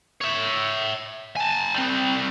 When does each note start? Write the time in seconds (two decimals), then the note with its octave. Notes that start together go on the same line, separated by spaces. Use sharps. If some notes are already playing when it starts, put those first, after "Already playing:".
0.21 C#5 E5
1.37 G#5 A5
1.75 G3 C4